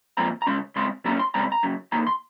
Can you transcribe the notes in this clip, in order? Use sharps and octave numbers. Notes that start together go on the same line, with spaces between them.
A#2 F3 G#3 C4 A#5
A#5
C#3 G#3 C#4 C6
C#3 G#3 C4 C6
C3 F#3 A#3 C#4 A#5
C6
C#3 G#3 C4 A#5
A#5
F#2 C#3
C3 D#3 A#3 A#5
C6